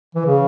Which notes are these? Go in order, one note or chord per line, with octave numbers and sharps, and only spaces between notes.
E3
C#3